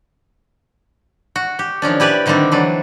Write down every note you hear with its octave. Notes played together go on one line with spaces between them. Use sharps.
F#4
G4
D#3 F3 C#4 D4
E4 G4 B4 D5 E5
D3 D#3 G3 A3 C4 D4
E3 F#3 D4